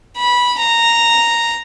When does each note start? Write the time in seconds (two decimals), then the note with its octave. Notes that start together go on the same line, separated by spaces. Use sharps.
0.17 B5
0.58 A#5